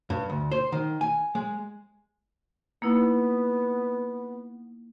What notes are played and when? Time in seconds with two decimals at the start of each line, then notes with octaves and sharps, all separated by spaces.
0.10 G2
0.30 D2
0.52 C5
0.72 D#3
1.01 G#5
1.35 G#3
2.82 A#3 B3 D#4 E4